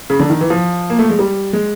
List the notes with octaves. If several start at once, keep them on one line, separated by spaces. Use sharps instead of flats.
C#3
D3
D#3
E3
F3
A#3
A3
G#3
G3
G#3